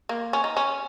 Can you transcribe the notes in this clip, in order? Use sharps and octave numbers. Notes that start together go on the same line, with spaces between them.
A#3
C#4
D#4
C#4